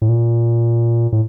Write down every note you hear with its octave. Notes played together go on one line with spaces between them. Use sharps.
A2
A#2
A2